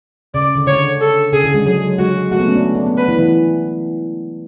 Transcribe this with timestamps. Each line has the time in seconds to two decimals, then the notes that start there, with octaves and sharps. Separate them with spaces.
0.34 C#3 D5
0.56 D3
0.66 D3 C#5
1.01 A4
1.33 C#3 G#4
1.44 D3
1.54 G#3
1.66 F#3 G#4
1.98 G#3 F#4
2.31 A3 F#4
2.39 B3
2.48 C#4
2.56 D4
2.75 D4
2.86 B3
2.97 B4
3.08 E3
3.18 E3